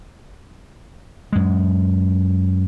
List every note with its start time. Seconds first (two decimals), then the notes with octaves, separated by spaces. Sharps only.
1.33 F#2 G#3